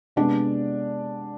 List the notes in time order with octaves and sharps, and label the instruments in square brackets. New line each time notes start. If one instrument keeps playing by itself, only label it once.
[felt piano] C3 G#3 B3 D4 D5